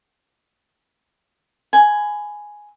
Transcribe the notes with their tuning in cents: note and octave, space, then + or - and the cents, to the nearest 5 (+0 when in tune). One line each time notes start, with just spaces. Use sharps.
G#5 +5 B5 +15